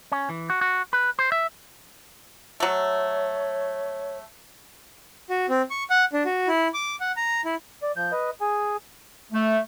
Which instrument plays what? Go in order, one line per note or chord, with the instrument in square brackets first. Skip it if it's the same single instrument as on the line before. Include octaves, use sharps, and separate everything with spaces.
[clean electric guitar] C#4
E3
F#4
F#4
B4
C5
E5
[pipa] F#3 A3 [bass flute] C#5
[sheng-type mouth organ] F#4
C4
C#6
F#5
D4
F#4
E4
D6
F#5
A#5
E4
[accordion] D5
F3 G6
B4 D#5
G#4 G#5
[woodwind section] A3